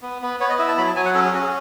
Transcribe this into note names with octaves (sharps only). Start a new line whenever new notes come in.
B3
B3
B3 C#5
D#5
E4 E5
A5
F#3 B5
A5
F#3 G#5
F#5
C#4 A4
G#4
C#4 F#4
G#4